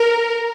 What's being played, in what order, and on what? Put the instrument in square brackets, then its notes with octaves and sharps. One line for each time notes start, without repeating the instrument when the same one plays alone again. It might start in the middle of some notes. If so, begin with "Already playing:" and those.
Already playing: [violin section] A#4